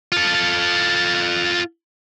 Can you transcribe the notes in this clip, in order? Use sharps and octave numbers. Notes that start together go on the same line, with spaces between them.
F4 A4